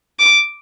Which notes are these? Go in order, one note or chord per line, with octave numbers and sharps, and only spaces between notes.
D6